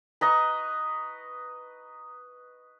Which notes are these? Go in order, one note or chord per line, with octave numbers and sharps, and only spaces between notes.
B4 D#5 A#5 C#6